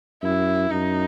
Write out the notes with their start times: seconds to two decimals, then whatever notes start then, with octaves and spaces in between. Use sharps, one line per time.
0.23 F#2 E4
0.70 F#2 D#4